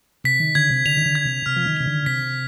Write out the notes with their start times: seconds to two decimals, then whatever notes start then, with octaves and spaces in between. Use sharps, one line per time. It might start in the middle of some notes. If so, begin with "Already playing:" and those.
0.24 C3 B6
0.40 D#3
0.55 D3 G#6
0.70 C3
0.86 D3 F7
0.97 D#3
1.06 D3
1.15 G#6
1.25 C3
1.46 C3 F6
1.56 F3
1.66 D#3
1.77 C3 F7
1.86 D3
2.06 C3 B6